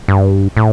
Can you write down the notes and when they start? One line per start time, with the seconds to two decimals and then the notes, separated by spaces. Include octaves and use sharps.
0.08 G2
0.57 A2